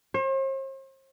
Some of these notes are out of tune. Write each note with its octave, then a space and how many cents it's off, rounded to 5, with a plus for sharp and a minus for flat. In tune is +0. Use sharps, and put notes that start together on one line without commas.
C5 +45